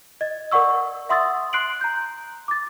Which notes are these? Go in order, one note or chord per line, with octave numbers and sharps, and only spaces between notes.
D#5 A6
A#4 D5 F#5 C#6 E6
E5 F#5 C6 D#6 E6 A6
C6 F#6 C7 D7 F#7
A#5 G6
D6 A6